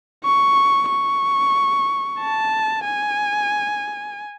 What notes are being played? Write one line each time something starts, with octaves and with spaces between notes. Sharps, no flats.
C#6
C#6
A5
G#5